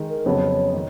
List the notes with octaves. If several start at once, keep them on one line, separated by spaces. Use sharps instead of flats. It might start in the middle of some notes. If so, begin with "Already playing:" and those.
Already playing: D#3 G#3 D#4
A#4
F2 C#3 F#3 B3 C#5
D#3